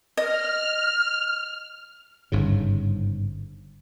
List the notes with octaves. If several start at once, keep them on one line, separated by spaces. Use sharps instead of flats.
D#5 F6
G1 G#2 C#3